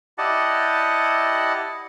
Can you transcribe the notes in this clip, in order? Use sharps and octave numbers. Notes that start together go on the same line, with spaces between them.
E4 G4 D5 D#5 F#5 A5